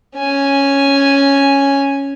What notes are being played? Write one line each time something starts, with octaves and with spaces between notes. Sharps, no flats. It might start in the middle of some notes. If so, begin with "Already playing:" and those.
C#4 G#5